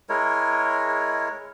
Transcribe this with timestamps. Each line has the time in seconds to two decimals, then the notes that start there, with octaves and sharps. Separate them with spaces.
0.09 G#3 E4 A#4 C#5